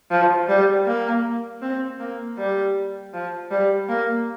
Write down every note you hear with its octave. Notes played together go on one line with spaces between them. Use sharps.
F3
G3
A#3
C4
A#3
G3
F3
G3
A#3